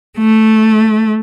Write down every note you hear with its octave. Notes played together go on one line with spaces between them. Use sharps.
A3